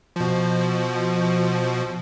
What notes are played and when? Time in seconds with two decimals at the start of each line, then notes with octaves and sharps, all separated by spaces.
0.16 B2 F3